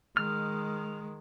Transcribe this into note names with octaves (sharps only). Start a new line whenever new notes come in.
D#3 G#3 F6